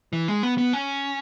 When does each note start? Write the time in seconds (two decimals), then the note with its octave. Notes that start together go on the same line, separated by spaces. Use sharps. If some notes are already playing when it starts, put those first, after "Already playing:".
0.13 E3
0.28 G#3
0.43 B3
0.58 B3
0.73 C#4